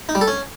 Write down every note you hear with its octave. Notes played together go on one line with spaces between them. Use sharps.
D#4
G3
A4
C#4